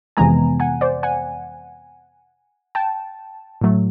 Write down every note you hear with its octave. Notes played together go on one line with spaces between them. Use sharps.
F2 C3 E3 G#3 B3 G#5 A#5
F#5 G#5
C5 D5
F#5 G#5
G5 A5
A2 F#3 A3